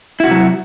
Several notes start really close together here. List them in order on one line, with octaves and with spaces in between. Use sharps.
E4 F#4 C3 F#3